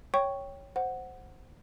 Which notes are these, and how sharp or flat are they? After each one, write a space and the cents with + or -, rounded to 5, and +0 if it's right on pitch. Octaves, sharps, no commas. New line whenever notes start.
C#5 +0 G5 +0 C#6 +0
C5 +0 F#5 +0